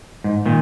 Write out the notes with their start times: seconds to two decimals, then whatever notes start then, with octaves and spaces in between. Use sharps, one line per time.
0.24 G#2
0.46 A#2 D#3